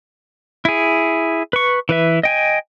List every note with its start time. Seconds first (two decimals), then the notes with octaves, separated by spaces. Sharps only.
0.65 E4 G#4
1.53 B4 C#6
1.89 E3 B4 E5
2.23 D#5 G5 G#5